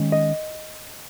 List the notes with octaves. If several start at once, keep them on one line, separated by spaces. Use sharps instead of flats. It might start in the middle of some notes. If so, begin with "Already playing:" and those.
Already playing: D#3 G#3 C#4
D#5